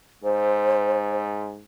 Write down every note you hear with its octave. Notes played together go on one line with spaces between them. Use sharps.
G#2 C5